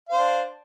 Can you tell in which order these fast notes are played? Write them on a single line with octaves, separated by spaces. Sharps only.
F5 C5 D4